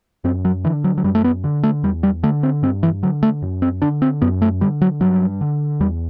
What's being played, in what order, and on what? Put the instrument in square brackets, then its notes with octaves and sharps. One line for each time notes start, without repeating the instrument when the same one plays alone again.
[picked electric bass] F#2 C4
F#3
D3 E3
F#3
F#3
F#2 G3
A3
B3
D3
A3
E2 G3
G3
D3 A3
C4
G2 C4
E3
D3 F#3
A3
F#2
C4
D3 D4
C4
F#2 B3
A3
D3 G3
F#3
G2 F#3
D3
E2 G3